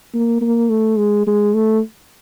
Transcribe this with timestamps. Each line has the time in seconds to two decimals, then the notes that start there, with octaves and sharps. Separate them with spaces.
0.14 A#3
0.41 A#3
0.69 A3
0.98 G#3
1.27 G#3
1.54 A3